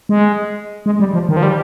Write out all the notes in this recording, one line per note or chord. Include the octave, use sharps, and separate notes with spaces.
G#3
G#3
G3
F3
D#3
F3
G3